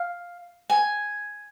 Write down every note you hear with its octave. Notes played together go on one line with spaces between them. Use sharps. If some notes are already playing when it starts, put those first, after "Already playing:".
Already playing: F5
G#5